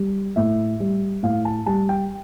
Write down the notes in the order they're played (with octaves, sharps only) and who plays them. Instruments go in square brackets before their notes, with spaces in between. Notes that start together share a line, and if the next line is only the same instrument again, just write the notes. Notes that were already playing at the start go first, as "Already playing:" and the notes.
Already playing: [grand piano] G3
A2 E5
G3
A2 F5
A5
G3 A5
G5